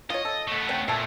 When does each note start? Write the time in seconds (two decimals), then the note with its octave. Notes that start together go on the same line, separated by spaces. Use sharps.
0.10 F4 C#5 D#5
0.25 A4
0.48 A3 B3
0.69 C#3 C4 G5
0.88 A#2 A3 A5